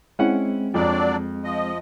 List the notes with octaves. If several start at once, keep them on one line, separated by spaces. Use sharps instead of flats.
G#3 C4 C#4 E4 F#5
F2 F#3 D4 D5
F3 D#5